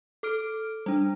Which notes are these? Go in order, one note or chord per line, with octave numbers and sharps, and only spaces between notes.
A4 D6 F6 D7
G3 D4